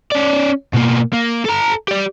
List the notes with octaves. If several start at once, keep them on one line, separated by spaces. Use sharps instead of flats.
C#4 D5
B2 A#3
A#3
A4 A#5
G4 D5